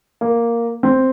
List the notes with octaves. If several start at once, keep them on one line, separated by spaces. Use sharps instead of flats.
A#3
C4